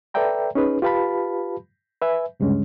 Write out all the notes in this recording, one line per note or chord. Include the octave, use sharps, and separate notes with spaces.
A4 B4 D5 E5 G5 A#5
C#4 D#4 G#4 B4
F4 G4 B4 F5 A5 B5
B4 E5 G#5
D2 G2 C#3 G#3 C#4